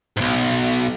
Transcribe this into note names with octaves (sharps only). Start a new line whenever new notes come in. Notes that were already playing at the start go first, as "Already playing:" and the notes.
B1 G#2